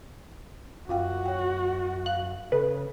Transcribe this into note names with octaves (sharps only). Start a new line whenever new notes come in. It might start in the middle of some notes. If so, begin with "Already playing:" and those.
F#2 F4 F#4 F5 G5
C#5 G5
F5 F#6
C#3 A4 B4